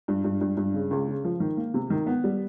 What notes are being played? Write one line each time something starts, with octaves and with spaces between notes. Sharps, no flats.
G2
G2
G2
G2
C#3
C#2
C#3
F3
D#3
A#3
C3
D#3
B3
G3